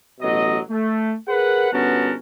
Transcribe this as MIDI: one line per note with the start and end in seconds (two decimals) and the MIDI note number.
0.20 0.58 33
0.20 0.58 47
0.20 0.58 54
0.20 0.58 75
0.70 1.13 57
1.28 1.72 68
1.28 1.72 70
1.28 1.72 71
1.28 1.72 78
1.72 2.14 31
1.72 2.14 59
1.72 2.14 61
1.72 2.14 66
1.72 2.14 70
1.72 2.14 81